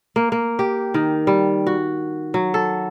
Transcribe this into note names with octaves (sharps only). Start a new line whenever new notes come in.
A#3
A#3
G4
D#3
G3
F#4
F#3
A4